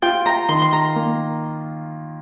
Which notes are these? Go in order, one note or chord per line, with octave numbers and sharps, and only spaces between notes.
F4 G5
A#5
D#3 C6
C6
A#5
A#3